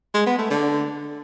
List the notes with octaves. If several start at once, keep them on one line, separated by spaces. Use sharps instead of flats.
G#3
B3
A3
D3